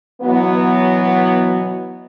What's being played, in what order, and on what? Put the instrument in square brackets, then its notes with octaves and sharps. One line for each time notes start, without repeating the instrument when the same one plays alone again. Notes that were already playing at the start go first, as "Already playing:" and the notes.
[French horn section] B2 E3 F#3 B3